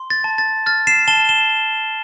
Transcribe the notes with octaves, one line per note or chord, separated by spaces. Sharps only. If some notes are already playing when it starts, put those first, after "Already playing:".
Already playing: C6
A6
A5
A6
F6 A6
C7 E7
A5 E7 G7
E7 G7